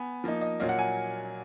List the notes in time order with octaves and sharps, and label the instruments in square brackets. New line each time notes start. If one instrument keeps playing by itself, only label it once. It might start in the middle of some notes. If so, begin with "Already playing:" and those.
Already playing: [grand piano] B3 G#5
F3 A#3 D#4
D#5
A#2 F#3 A#3 D#5
F#5
G#5